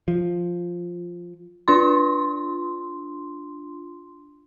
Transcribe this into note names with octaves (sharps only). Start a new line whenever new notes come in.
F3
D4 F4 C6